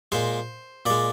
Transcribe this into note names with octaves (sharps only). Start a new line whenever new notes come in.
A#2 G#3 C5
A#2 G#3 D5